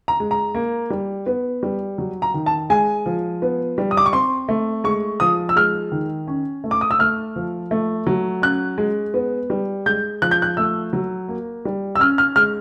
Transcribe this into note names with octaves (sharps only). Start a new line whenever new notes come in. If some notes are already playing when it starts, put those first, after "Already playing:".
A#5
G#3
A#5
A#3
G3
B3
G3
F#3
A#5
D#3
A5
G#3 G#5
F3
B3
G3
D#6
D6
C#6
C4 C6
A3
G#3 C#6
F3 D#6
E6
G#3 F6
D#3
C#4
A3
D6
D#6
E6
A3 F6
F3
A3
F#3
C#4 F#6
G#3
B3
G3
G#3 G6
F3 F#6
G6
F#6
A3 E6
F#3
A#3
G3
E6
C#4 F6
F6
G#3 F6